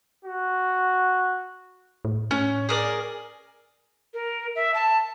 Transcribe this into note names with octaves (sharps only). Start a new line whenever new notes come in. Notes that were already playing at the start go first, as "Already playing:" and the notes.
F#4
A2
A2 C#4
G#4 A#4 D5
A#4
E5
A5